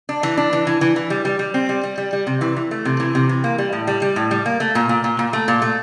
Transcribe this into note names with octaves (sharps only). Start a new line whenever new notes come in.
D4
E3
D4
E3
E3
E3
E3
G3
G3
G3
C4
G3
G3
G3
G3
C3
E3
E3
A3
C3
E3
C3
E3
A#3
G3
A2
G3
G3
A2
G3
A#3
A3
A#2
A#2
A#2
A#2
A3
A#2
A3